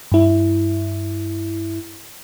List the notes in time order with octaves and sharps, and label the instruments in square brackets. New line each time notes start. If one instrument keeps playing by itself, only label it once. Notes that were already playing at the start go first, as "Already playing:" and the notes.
[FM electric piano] G2 E4